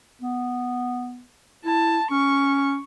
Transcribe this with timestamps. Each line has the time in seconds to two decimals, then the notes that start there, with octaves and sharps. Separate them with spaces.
0.22 B3
1.65 E4 A5
2.11 C#4 C#6